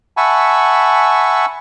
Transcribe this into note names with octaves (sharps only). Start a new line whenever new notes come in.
E5 F#5 G#5 A5 B5 C#6